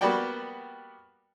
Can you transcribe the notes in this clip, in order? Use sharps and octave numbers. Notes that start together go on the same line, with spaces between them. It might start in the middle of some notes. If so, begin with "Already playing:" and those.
G3 A#3 B3 F#4 D5 G5